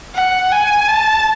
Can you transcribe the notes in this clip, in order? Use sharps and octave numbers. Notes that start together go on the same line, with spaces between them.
F#5
G#5
A5